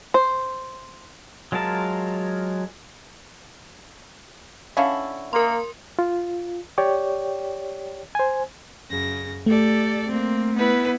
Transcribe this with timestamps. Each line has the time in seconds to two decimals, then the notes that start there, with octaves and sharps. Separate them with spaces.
0.14 C5
1.52 F#3 G#3 F4 A#4 A5
4.77 D3 C#4 E4 E5 F5 A5
5.33 A#3 A#4 C6
5.99 F4
6.78 G4 C#5 D5 G5
8.15 C5 G#5
8.89 F#2 C#3 A#6
9.46 A3 G4 A4 D5
10.08 A#3 C4
10.55 B3 E4 B4